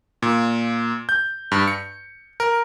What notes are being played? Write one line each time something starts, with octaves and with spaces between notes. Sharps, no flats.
A#2
G6
G2
C#7
A#4